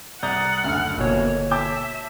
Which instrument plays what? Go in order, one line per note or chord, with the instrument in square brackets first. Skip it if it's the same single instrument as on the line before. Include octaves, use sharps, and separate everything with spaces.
[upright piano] C2 D5 G6 [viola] F#5 [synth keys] A#5 D#6 A6
[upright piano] F#1 D2 [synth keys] F6
[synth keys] G1 B2 C#5 [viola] A#3
[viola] E5 [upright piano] A5 D6 G6